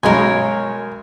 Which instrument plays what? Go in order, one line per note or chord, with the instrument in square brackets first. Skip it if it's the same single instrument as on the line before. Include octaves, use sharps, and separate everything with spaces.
[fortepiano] B1 G#3 [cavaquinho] A#4 C#5 G#5